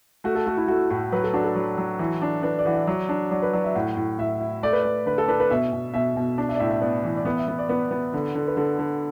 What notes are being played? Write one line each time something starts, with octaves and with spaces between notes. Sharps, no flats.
A3 F#4
A4
A3 F#4
E4
A3 F#4
A2 F#4
F#3 B4
A4
D4 F#4
A4
F#3
F#3
E3
D4
D4 B4
D5
E3 F#5
E5
F#3 D5
D4
F#3 D5
B4
F#3 D5
E5
A2 F#5
A2
A2 E5
E4
A3 D5
B4
A3 D5
D3 B4
A4
D4 B4
B4
B2 E5
B2
B2 E5
B2
D4
E5
D5
A2 E5
E5
B3 D5
E3
D5
B3 B4
E5
B3
D5
B3 B4
B3
D3
D3
B4
D3 A4
D3